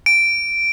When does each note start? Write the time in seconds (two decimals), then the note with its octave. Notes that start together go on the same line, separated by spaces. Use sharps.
0.06 D7